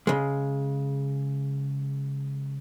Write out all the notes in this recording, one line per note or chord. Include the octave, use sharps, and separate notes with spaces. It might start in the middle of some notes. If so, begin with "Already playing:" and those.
C#3 G#3